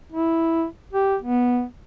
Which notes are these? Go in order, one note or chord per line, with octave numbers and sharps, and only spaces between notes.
E4
G4
B3